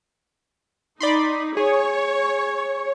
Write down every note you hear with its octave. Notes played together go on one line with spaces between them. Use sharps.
D#4 D5 B5 C6
G#4 C#5